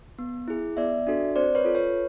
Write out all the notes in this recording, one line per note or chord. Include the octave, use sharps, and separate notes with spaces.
B3
E4 G#4
B3 D5 E5
D4 F#4 A4
C4 C5 D5
B4 C#5
F4 A4
B4 C#5